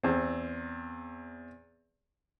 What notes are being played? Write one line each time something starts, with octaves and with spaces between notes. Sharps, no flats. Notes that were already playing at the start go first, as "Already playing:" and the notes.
E2 C4